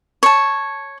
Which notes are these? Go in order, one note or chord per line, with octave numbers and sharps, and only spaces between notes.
C#5 A5